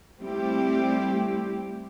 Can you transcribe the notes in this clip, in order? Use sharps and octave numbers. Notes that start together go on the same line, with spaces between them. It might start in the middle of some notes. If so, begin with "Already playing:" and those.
G3 A3 C4 E4 G4